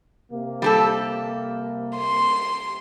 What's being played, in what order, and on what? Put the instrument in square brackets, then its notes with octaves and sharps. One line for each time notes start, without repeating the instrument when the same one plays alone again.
[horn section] C3 A#3
[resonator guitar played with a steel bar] G3 G4 A4
[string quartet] C6